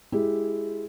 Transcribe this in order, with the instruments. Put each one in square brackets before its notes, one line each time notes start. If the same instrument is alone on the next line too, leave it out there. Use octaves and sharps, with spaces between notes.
[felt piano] G#3 E4 G4 G#4